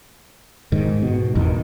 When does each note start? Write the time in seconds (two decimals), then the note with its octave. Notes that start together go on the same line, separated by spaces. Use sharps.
0.72 G#2 D#3
1.02 B2
1.35 G#1 E2 B2 D#3